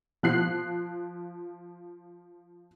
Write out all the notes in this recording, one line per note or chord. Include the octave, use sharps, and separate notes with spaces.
F3 F#6 C7